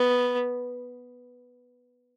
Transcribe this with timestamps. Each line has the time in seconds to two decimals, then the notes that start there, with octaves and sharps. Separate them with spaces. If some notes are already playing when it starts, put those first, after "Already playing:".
Already playing: B3